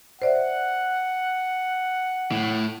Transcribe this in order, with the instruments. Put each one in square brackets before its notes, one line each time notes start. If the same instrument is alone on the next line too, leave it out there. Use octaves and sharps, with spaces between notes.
[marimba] C5 D5 E5 [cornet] F#5
[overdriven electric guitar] A2